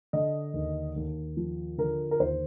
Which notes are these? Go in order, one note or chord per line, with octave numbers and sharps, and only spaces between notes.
D3 D#5
D#2
D#2
F3
D3 A#4
A#4
D#2 C5